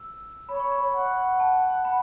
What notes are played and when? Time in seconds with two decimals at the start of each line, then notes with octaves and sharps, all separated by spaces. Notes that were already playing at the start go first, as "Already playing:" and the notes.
Already playing: E6
0.49 C#5 B5
0.60 C#6
0.72 B5
0.94 F#5
1.40 A5
1.85 B5